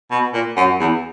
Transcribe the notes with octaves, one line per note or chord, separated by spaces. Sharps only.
B2
A#2
F#2
E2